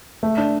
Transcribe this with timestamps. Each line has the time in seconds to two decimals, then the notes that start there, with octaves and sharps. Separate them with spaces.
0.23 A3
0.38 D4